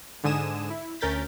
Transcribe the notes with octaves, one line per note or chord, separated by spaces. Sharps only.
G#2 D3 G#5 D#6 E7
E4
D2 C#4 A#4 G6 A6 B6